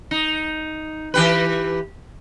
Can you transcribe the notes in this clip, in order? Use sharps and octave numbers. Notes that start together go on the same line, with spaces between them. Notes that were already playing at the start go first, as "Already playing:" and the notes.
D#4
E3 G4 B4